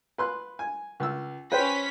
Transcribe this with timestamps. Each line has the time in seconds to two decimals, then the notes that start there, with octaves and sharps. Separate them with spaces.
0.18 B4 C6 F#6
0.59 G#5
1.00 C#2 E6
1.52 C#4 B4 C5 G5 B6